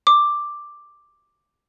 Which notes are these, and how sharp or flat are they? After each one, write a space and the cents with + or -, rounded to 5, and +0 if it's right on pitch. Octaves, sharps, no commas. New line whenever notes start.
D6 +5